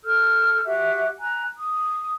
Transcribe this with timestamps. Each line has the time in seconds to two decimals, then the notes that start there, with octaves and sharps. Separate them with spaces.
0.03 A4 E6 F6 G6
0.65 F#4 G4 E5
1.19 G#5 A#5 F#6
1.56 D#6